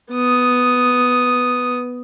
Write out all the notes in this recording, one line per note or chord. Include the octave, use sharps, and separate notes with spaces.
B3 D#6